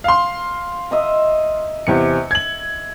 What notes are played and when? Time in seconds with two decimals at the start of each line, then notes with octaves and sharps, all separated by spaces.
0.04 F5 C6
0.91 D#5 E5 A#5
1.87 E2 C3 C#7
2.31 G#6 F#7